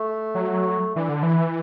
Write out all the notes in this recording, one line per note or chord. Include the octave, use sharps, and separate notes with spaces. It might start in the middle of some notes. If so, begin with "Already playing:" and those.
Already playing: A3
F#3
E3 D4
D3
E3 E4